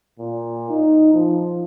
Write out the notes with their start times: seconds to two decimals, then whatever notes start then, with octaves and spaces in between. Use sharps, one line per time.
0.19 A#2
0.69 D#4
1.13 F3